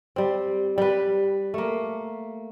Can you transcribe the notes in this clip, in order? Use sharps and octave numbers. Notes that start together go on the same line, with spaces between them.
G3 C4
G3 B4
A3 A#3